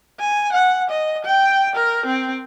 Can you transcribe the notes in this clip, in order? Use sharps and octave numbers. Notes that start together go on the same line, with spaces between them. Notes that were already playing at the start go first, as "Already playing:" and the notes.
G#5
F#5
D#5
G5
A#4
C4